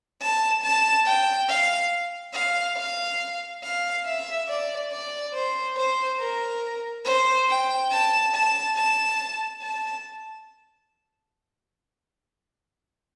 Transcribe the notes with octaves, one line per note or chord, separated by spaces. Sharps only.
A5
A5
G5
F5
F5
F5
F5
E5
D5
D5
C5
C5
A#4
C5
G5
A5
A5
A5
A5